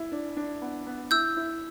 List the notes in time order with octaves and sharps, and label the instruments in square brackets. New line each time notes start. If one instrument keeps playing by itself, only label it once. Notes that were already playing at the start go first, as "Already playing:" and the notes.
Already playing: [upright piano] E4
D4
D4
B3
B3
[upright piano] E4 [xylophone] E6 G6
[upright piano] E4